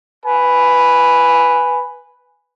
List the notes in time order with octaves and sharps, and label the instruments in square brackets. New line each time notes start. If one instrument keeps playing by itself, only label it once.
[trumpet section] B4 G#5